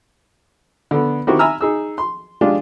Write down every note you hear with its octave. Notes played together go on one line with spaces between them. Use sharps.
D3 B3
D#3 C4 E4 F#4 G4
E5 G#5 A#5 B5 E6 F6
D#4 G#4 E6
C6
G#3 D4 F4 G4 D5